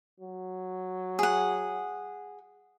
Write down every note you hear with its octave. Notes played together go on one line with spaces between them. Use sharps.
F#3
G#4 F#5